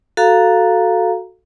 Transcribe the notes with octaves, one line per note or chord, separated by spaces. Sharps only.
F#4 A4 F5 A#5